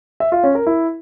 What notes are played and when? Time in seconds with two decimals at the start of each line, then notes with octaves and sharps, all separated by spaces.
0.20 E5
0.32 F4
0.43 C#4
0.55 A#4
0.67 E4